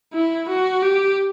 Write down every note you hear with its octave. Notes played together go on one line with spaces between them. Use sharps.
E4
F#4
G4